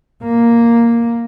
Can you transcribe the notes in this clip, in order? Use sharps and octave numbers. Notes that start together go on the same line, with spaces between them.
A#3